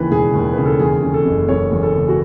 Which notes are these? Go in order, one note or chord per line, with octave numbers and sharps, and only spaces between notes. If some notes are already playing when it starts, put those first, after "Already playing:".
Already playing: D#2 C#3 E3 B4
E1 G#4
D#2
C#3 B4
A4
E2 G#4
C#3
A4
F#1
F#1 C#5
E2
A4
C#3
F#4